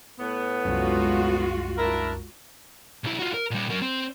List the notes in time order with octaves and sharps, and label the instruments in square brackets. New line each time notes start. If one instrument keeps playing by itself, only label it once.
[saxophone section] A2 B3
[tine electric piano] C2 F#2 [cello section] G#3 F4 F#4
[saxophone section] D4 E4 A#4
[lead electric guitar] B1 E4
F4 F#4
A#4
A#2 G3
F#3 A#4
C4